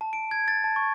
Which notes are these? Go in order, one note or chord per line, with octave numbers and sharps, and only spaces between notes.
A5
D7
G#6
A6
A5
C#6